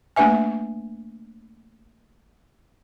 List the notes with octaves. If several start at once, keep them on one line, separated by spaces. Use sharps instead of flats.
A3 A#3 D4 B4 E5 G#5